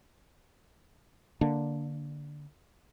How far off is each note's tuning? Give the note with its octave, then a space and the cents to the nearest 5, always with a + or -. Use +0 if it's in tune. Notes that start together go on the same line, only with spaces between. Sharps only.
D3 +0 A#3 +0 D4 +0